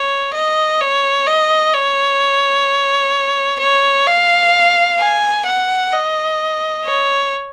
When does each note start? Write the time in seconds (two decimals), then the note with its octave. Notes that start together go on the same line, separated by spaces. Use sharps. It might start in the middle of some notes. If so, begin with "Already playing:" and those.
Already playing: C#5
0.34 D#5
0.81 C#5
1.27 D#5
1.74 C#5
3.59 C#5
4.07 F5
4.99 G#5
5.45 F#5
5.92 D#5
6.85 C#5